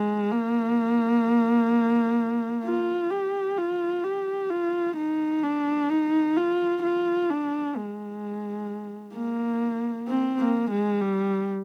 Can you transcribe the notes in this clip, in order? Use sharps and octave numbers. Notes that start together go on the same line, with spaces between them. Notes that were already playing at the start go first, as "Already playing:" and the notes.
Already playing: G#3
A#3
F4
G4
F4
G4
F4
D#4
D4
D#4
F4
F4
D4
G#3
A#3
C4
A#3
G#3
G3